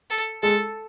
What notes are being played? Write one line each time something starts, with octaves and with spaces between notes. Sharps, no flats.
A4
G#3 A4